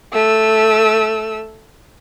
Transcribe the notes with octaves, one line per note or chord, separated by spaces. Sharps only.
A3 E6